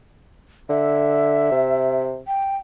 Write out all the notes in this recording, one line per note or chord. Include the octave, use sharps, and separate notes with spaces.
D3 E5
C3
G5